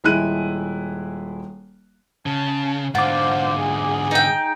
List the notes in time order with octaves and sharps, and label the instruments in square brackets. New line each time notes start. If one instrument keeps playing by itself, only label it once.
[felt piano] D#1 G#3 E4 F#6 D#7
[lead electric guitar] C#3 [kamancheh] A5
[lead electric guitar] G#2 D3 [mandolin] F4 [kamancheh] C5 F5 [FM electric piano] F#5 D6
[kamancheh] G#4
[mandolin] D#4 G5